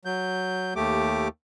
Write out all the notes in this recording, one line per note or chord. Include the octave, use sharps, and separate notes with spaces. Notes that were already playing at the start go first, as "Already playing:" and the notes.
F#3 G6
D#2 A3 G4 D6